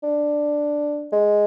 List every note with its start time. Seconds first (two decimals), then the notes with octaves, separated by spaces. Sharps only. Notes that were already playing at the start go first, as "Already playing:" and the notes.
0.03 D4
1.12 G#3